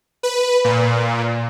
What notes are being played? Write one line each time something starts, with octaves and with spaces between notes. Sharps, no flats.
B4
A#2